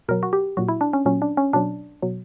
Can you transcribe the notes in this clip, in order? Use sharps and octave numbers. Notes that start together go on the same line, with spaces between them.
B2 F#3 A#4
F#4
G4
A#2 F#3 F#4
E4
D4
C#4
A#2 F#3 C#4
D4
C#4
B2 F#3 D4
B2 F#3